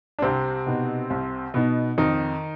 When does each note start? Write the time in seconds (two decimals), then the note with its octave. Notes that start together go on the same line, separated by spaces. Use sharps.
0.19 D4
0.22 C2 C3 C4
0.66 B2 B3 D#4
1.10 C2
1.54 B2 B3 D#4
1.98 F2 D#3 D#4